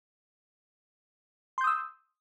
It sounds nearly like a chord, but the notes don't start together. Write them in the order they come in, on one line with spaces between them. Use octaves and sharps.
C6 G6 D#6 E6